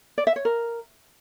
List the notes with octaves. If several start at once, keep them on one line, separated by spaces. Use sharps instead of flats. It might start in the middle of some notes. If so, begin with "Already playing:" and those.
D5
E5
C#5
A#4